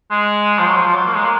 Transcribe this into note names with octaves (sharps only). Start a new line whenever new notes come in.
G#3
F3
F#3
F3
F3
F#3
A#3
G#3
A#3